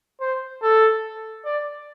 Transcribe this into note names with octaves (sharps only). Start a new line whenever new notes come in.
C5
A4
D5